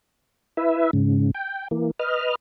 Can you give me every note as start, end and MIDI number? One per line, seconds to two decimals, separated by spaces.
0.57 0.91 64
0.57 0.91 71
0.57 0.91 76
0.93 1.31 44
0.93 1.31 49
1.35 1.68 79
1.71 1.91 52
1.71 1.91 58
1.99 2.35 71
1.99 2.35 75
1.99 2.35 89